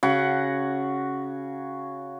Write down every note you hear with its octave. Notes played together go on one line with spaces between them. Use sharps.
C#3 F#4 F#5